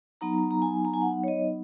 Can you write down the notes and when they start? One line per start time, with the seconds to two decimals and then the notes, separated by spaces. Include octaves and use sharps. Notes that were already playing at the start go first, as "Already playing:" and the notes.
0.21 F#3 B3 D#4 A#5
0.51 A#5
0.62 G#5
0.85 A#5
0.94 G#5
1.02 F#5
1.24 C#5
1.28 D#5